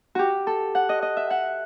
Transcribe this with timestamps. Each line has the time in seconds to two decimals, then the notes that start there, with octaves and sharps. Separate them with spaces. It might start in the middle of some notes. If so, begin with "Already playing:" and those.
0.15 F#4 G4
0.47 A4
0.75 F#5
0.89 D#5
1.02 D#5
1.17 E5
1.30 F#5